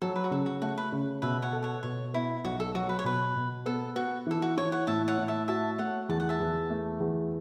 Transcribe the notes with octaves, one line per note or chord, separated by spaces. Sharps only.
F#3 A4
B4
F#4
C#3 A4
F#4
A3 F#4
B4
C#3
B2 B4 E5
C#5 F#5
A4
C#5 F#5
B2 C#5
B3 E4
B1 F#4
A4
F#3 F#4
B4
C#5
B2 B4
B2
B3 A4
B3 F#4
E3 A4
F#4
E3 C#5
C#5 F#5
A2 E5 A5
C#5 F#5
A2
E5 A5
F#4 E5 A5
A3 C#5 F#5
E2 A5
F#5
E5 A5
E2
A3
E2